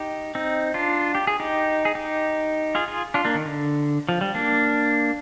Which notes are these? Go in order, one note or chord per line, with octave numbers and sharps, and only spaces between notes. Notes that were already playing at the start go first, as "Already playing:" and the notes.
Already playing: D#4 G4
C4 D#4
D4 F4
G4
G#4
D#4 G4
G#4
D#4 G4
F4 G#4
F4 G#4
D4 F4
A#3 D4
D#3
D3
F3
G3
A#3 D4